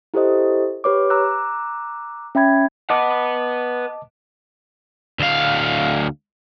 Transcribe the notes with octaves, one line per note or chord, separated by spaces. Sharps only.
E4 G4 A4 C5 D#5
G4 B4 C#5 D6
A#5 D6 E6 F#6
C#4 E5 G5 B5 G#6
B4 D#5 F#5 A5 D6
D2 F5